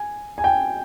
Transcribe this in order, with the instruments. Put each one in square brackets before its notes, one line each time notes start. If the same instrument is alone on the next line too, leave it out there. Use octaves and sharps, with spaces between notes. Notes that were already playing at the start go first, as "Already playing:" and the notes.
Already playing: [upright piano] G#5
G#5
G5